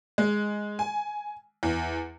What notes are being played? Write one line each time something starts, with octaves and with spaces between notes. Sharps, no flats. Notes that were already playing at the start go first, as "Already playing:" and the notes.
G#3
G#5
E2